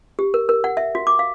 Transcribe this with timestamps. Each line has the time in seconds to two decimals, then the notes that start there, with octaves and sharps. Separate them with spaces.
0.19 G4
0.34 A#4
0.49 A#4
0.64 F#5
0.77 E5
0.95 F#4
1.07 D6
1.19 F5